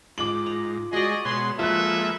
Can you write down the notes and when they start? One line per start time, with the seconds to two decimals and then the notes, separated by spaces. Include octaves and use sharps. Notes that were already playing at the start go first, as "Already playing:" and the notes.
0.18 G#2 F4 G5 D6 F#7
0.46 A#5
0.93 G#3 F#4 G#4 D5 D#5
1.25 B2 G#3 B3 C#5 F#5 C6
1.59 F3 G#3 A#3 F4 A4 B4 E5 F#6